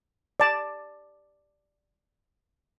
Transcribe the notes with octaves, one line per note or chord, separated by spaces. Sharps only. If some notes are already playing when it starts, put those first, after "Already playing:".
D5 A5